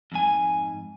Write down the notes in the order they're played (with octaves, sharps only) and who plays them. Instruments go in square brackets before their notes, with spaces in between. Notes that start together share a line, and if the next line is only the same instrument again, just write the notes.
[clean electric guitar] F2 G#2 G#5